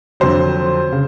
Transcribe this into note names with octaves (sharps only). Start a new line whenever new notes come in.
F2 D3 F#3 C5
C#3